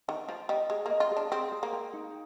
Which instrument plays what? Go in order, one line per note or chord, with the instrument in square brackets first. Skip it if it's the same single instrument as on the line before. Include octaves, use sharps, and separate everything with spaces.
[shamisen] D#3 [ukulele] G5
[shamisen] F3 [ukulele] G5
[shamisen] G3 [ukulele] D#5
[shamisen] G#3 [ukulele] G#4
[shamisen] A#3
[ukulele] D#5
[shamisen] F4
[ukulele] G#4
[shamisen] D4
[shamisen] C4 [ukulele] G#4
[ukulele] G#4
[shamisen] A#3
[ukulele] G5
D#4